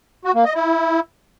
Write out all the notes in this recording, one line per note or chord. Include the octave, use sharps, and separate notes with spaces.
F#4
A#3
D#5
E4